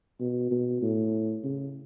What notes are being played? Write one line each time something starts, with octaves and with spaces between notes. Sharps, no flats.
B2
B2
A2
C#3